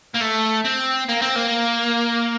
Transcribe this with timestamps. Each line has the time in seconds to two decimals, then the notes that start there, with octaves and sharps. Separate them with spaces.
0.15 A#3
0.21 A3
0.65 C4
1.09 A#3
1.22 C4
1.36 A#3